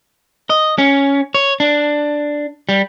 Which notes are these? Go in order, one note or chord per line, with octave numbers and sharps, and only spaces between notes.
D#5
C#4
C#5
D4
G3